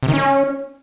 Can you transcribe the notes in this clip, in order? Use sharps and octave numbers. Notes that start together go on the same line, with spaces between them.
C3
D#3
C#4